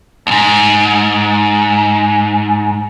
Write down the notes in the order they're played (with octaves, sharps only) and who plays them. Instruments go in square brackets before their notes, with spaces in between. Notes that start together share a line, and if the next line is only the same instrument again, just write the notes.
[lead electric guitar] D#2 G#2